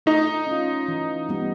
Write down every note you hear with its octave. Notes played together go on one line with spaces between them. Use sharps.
A3 D#4
C#4 F4
E3
G3 B3